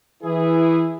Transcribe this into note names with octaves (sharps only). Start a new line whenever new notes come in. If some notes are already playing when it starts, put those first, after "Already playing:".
E3 E4 G#4